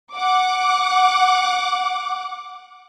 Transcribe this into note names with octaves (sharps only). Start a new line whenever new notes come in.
F#5 D6